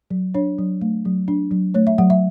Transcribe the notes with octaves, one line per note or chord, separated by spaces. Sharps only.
F#3
D4 C#5
F#3
A3
F#3
D4
F#3
A3 C#5
E5
F#3 F#5
E5